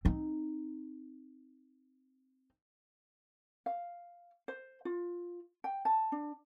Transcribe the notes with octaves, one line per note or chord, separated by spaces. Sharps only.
C4 D#4
F5
C5
F4
G5
A5
D4